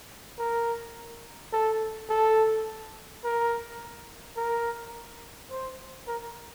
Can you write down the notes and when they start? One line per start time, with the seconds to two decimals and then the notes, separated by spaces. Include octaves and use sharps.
0.39 A#4
1.53 A4
2.10 A4
3.24 A#4
4.37 A#4
5.51 C5
6.07 A#4